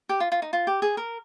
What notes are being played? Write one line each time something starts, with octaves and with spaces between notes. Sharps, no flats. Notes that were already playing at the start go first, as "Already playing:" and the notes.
G4
F4
F4
D#4
F4
G4
G#4
A#4